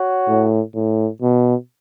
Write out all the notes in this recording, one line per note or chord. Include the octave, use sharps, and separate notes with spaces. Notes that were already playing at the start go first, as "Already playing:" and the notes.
Already playing: F#4 C#5 F#5
A2
A2
B2